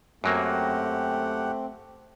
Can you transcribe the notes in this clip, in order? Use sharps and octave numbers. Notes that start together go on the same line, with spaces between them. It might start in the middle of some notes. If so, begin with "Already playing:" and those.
F#2 F#3 A3 A#3 C4 G4 F#5